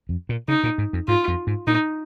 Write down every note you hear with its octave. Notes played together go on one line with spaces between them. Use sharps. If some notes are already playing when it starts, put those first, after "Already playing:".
F2
A#2
C#3 D#4
A#2
G#2
F2
G#2 F4
F2
G#2
A#2 D#4